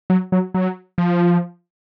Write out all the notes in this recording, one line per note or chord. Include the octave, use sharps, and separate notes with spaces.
F#3
F#3
F#3
F3